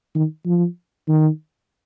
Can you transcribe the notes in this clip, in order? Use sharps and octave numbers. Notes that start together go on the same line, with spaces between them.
D#3
F3
D#3